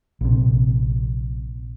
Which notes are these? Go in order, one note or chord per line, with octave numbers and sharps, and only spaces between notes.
A#1 C3